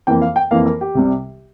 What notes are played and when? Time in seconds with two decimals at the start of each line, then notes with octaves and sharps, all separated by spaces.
0.07 F2 E3 A#3 G5
0.21 F5
0.36 G5
0.51 F2 E3 A#3 F5
0.66 A#4
0.81 G4
0.95 C2 C3 G3